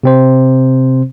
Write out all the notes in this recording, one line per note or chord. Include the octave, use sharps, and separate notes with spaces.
C3 C4 C5